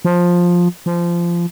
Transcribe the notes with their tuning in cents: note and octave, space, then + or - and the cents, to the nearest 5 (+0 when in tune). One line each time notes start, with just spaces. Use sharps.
F3 +10
F3 -20